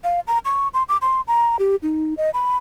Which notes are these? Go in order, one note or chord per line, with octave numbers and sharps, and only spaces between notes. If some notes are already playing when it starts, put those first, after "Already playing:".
F5
A#5
C#6
C6
D6
C6
A#5
G4
D#4
D#5
B5